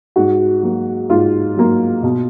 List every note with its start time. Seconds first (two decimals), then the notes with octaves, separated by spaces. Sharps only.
0.16 G#2 F#4
0.63 F#3 A#3
1.10 G#2 F4
1.57 F#3 A#3
2.03 B2